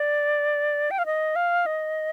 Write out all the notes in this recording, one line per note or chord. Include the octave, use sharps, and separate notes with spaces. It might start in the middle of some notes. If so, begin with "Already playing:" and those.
Already playing: D5
G5
F5
D#5
F5
D#5